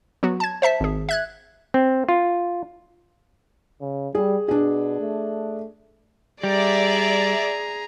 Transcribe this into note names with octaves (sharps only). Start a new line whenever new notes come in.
F#3 B3 F#4
A5 G#6
C5 E5 A5 B6
G#1 G#4
E5 F#6 G#6
C4
F4
C#3
G3 G#4
B2 D4 G#4
A3
G3 G#4 D5 E5 A#5